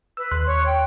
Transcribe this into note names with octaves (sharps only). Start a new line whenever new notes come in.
B4 E6
D#2 C6 F#6
C#5
G5